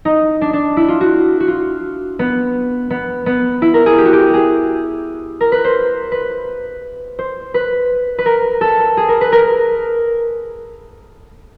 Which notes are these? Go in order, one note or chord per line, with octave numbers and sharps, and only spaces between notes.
D#4
D4
D4
E4
F4
F#4
F#4
F4
B3
B3
B3
E4
A#4
G#4
G4
F#4
G4
G#4
A#4
B4
C5
B4
C5
B4
B4
A#4
A4
G#4
A#4
B4
A#4